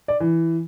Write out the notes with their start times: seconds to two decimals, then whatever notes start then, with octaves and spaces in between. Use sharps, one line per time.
0.08 D5
0.20 E3